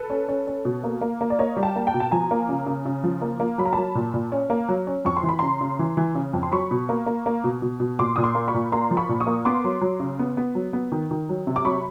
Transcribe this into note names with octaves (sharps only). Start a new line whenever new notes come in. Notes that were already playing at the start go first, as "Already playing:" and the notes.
Already playing: A4 B4
C#4
C#4
C#4
B2
A#3
A#3
A#3
D5
A#3 C#5 D#5
G3
G5 A5
A#3
G5 A5
B2
A5
F3 G#5 A#5
A#3
C#3
C#3
C#3
F3
A#3
A#3
F#3 B5
A#5
F#3 A5 B5
A#2
A#2
C#4
A#3
F#3
C#4
F2 C#6
C6
E3
B5
C#3 A#5 C6
C#3
E3
E3
C#3
F2
C6
F#3 B5 C#6
B2
A#3
A#3
A#3
B2
B2
B2
A#2 C6 D6
A#2 D#6
C6 D6
A#3
B5 C#6
A#2
A#3 A#5 C6
F3
B5 C#6
A#2
C#6 D#6
A#3
B3 C6 D6
F#3
F#3
C#3
B3
B3
F#3
B3
D#3
D#3
F#3
C3
D6
F#3 B5 C#6